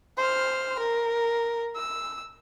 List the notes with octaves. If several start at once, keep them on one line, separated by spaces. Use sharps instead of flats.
C5 F6
A#4
E6